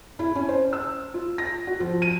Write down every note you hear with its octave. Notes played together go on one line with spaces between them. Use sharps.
E4
C#4
C5
E6
F4
A#6
F#4
F3
D#7